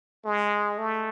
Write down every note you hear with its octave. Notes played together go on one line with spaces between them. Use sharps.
G#3
A3